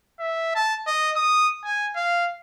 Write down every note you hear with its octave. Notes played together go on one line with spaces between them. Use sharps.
E5
A5
D#5
D#6
G#5
F5